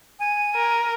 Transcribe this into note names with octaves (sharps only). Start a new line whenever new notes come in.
G#5
A#4